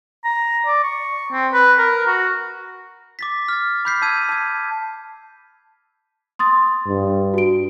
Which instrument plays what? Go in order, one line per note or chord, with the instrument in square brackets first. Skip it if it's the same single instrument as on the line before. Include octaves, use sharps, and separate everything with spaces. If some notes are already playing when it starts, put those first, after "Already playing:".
[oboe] A#5
D5
C#6
C4
B4
A#4
F#4
[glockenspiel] D6 A6 B6
F6 A6
B5 D6 G6 B6 C7
A5 E6 G#6 D#7
A5 G#6
[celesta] C6 D#6 A6
[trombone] G2
[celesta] F#4 D7